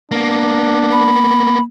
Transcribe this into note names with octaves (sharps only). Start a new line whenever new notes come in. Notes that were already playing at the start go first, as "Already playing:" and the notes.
A#3 B3 D4
B5